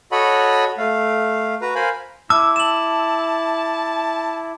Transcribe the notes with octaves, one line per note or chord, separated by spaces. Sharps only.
F#4 A4 C#5 D#5 F#5 B5
A3 F5
F#4 B4 A#5
A#4 C5 F5 G#5 B5
E4 A5 D6 E6
A5 E7 F#7